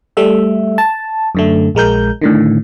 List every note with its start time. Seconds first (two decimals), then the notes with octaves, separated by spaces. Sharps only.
0.17 G3 A3 E5
0.78 A5
1.35 F#2 D3 A3
1.75 A#1 G#3 A#4 G6
2.22 A2 D3 D#3